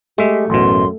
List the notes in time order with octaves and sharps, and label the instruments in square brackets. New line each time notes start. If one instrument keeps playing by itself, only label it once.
[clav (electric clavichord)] G#3 E5 [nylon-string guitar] A3 [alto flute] G4
[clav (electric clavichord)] A1 B2 [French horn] F#2 [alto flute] C6